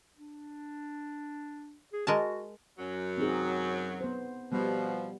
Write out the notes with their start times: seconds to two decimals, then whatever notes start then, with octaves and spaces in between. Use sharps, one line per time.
0.16 D4
1.93 G#4
2.07 G#3 F#4 A#4 A5
2.78 F#2 F#3
3.18 C4 D#4 G#4
4.01 B3 C5
4.52 B2 F3 G3 B3